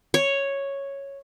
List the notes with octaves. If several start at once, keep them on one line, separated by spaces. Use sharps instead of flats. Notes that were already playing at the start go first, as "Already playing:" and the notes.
C#5